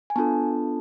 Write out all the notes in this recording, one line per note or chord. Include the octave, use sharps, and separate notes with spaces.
G#5
B3 D4 F4 A4 A5